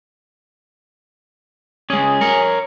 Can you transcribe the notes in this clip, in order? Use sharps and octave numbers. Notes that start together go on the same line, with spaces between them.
G#3 C#4 G#4
A#4 C#5